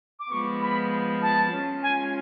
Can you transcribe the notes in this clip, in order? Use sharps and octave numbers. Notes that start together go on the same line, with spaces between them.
D6
F3 G#3 B3 C#6
B5
A5
G#3 C#4 F4
G#5